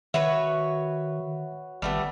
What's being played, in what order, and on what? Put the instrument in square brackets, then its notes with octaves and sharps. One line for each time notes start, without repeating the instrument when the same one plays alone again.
[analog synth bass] D#3 [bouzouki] F#4 B4 C#5 [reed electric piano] E5
[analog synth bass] G#1 [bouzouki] G3 A3 B3